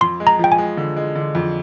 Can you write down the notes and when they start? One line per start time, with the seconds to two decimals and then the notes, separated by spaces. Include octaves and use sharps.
0.01 F2 C6
0.20 G#3
0.27 A#5
0.39 F3 G5
0.52 G#5
0.58 G#3
0.77 D3
0.97 G#3
1.15 D3
1.35 F2